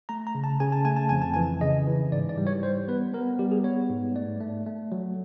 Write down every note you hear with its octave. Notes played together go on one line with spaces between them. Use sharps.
A3 A#5
A#5
C#3
A5
C#3 G#5
A5
A3 G#5
A5
F2 G#5
A5
E3 G#5
C#3 D#5
E3
G#2 D5
D5
G3
C#5
G3 C5
B3 B4
B3 A#4
G3 G4
G#4
B3 C#5
G#2
A3 D5
A3
A3
F#3